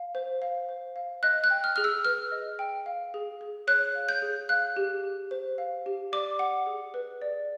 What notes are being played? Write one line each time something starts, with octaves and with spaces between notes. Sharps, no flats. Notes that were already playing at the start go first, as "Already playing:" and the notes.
Already playing: F5
C5
F5
C5
F5
D#5 F#6
F#6
G5
F6
G#4 F6
E6
B4 F6
D#5
G5
F5
G#4
G#4
C#5 F#6
F5
G6
G#4
F5 F#6
G4
G4
C5
F5
G4
D5 D6
F#5
G#4
B4
D5